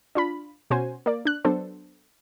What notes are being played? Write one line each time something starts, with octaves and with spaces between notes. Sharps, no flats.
D4 F4 B5
B2 C#4 F#4 C5 G#5
A#3 D5
D4 F#6
F#3 B3 D4 A4 C5